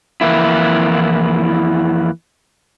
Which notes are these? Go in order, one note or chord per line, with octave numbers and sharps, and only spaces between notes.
F2 E3 A#3 E4